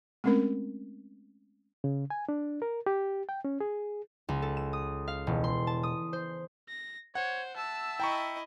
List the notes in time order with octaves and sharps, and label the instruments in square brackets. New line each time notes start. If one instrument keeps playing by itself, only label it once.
[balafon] G#3 A3 C4 C#4 A#4
[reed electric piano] C#3
G#5
D4
A#4
G4
G5
C#4
G#4
[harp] C#2
A4
E7
D#6
F5
E1
C6
A5
D#6
C5
[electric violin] A#6
[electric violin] C5 [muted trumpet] C#5 [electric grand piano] F#5
[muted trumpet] E5 [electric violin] A5 E6
[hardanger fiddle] E4 D#5 [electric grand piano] G5 A#5 C#6